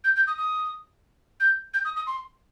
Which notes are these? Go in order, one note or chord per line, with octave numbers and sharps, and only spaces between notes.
G6
G6
D#6
D#6
G6
G6
D#6
D#6
C6